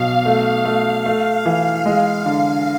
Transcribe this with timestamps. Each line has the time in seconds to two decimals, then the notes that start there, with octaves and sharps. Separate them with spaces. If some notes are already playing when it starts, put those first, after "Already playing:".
Already playing: B1 B2 F5
0.25 A3
0.65 A3
1.06 A3
1.46 E3
1.86 G#3
2.26 D3